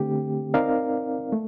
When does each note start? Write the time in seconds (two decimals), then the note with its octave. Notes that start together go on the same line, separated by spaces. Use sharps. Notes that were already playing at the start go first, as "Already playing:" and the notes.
Already playing: D3 A3 C4 G4
0.54 C4 D#4 A#4 D5 F5
1.32 A3